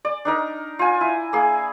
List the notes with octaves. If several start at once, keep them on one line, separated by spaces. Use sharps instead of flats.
D5
D4 D#4 A#4
F4 G#5
E4
A#3 G#4